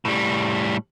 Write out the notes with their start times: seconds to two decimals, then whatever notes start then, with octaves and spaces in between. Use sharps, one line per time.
0.05 A2 G3